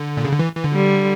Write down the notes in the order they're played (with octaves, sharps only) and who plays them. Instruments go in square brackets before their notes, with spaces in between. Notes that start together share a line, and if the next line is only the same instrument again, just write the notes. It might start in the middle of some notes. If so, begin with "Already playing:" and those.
Already playing: [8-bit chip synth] D3
A#2
C#3
D3
E3
E3
D3
[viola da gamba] G3